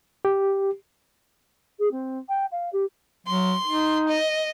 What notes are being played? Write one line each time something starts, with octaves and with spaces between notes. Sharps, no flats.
G4
G#4
C4
G5
F5
G4
F#3 C6
D#4
D#5